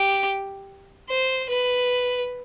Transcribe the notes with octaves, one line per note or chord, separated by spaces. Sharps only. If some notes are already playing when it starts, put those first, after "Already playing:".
Already playing: G4
C5
B4